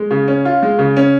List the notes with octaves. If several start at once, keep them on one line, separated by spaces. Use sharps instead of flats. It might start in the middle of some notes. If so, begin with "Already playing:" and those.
Already playing: G#3
C#3
C#4
F4
G#3
C#3
C#4